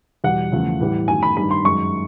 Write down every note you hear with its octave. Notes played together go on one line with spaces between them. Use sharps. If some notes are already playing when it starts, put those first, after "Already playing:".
E2 B2 G3 F#5
E2 C#3 F3 A3
A2 E3 G3
F#2 D#3 F#3 A3 G#5
B5
G2 D#3 G3 B5
C6
F#2 D#3 G#3 C#6